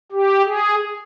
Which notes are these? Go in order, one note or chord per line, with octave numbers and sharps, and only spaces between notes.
G4
G#4